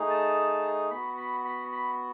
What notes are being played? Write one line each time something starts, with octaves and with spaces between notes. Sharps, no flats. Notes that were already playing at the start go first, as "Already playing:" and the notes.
Already playing: A3 D#4 G#4
A5
B3 F#4 B5
B5
B5
B5